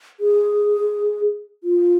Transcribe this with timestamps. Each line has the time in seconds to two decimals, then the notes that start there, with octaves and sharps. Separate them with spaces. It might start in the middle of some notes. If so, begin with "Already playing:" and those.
0.20 G#4
1.64 F4